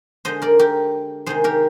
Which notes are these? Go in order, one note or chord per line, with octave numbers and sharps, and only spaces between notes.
D3 G#3 C5 D#5
A#4 D5
G4 A#4
C3 D#3 G#3 G#4 C5
G4 A#4